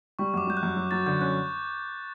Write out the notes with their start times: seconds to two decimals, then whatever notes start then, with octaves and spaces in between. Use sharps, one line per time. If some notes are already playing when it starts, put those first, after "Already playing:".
0.19 G3 C#6
0.34 F#2 D6
0.47 G3 G6
0.57 F#6
0.63 F#2
0.77 F#3
0.91 F#3 A6
1.06 D3 G6
1.21 C#4 F#6